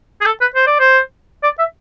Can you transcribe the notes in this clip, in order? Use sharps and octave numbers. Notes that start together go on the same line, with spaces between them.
G#4
A4
B4
C5
D5
C5
D5
E5